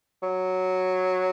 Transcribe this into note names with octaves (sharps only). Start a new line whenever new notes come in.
F#3